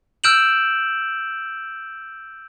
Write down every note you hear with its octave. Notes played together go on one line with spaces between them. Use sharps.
E6 F6 G6 D7 E7 F#7